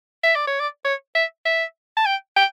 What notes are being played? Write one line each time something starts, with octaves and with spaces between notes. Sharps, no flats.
E5
D5
C#5
D5
C#5
E5
E5
A5
G5
G5